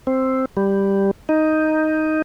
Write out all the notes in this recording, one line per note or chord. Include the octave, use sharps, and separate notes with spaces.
C4
G3
D#4